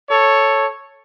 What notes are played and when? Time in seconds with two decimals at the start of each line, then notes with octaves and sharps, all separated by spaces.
0.10 A4 C#5